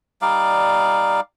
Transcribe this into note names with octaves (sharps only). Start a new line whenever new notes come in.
G3 D#4 D5 F5